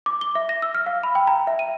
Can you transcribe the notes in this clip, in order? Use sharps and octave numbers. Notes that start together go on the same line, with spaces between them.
D6
G7
E5
A#6
E6
F6
F5
B5
G5
A#5
E5
D#7